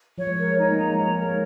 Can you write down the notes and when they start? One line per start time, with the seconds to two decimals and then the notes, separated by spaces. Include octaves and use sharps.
0.18 F3 C#5
0.27 G#3
0.35 F3 A#4
0.48 G#3
0.58 D#4
0.70 A#3
0.78 G#3 A#5
0.93 F3 C#5
1.08 A#3
1.18 G#3 A#4